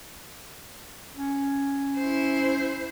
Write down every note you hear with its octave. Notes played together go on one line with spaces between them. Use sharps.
C#4
E4 C5